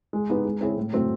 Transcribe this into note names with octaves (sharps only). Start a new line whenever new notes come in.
G#3
B3 D#4 G4 B4
G#3
C4 E4 G#4 C#5
A2
F#3 A3 C4